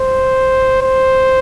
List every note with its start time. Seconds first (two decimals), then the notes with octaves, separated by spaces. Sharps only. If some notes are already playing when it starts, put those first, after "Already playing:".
Already playing: C5
0.82 C5